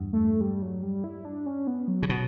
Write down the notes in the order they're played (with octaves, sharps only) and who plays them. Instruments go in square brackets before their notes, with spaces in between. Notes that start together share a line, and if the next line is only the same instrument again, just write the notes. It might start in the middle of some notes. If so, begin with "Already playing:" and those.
Already playing: [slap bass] E2 G2
[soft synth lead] A3
G3
F#3
G3
E4
D4
C#4
B3
F#3
[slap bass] C#3
[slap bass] B2 [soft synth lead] F#3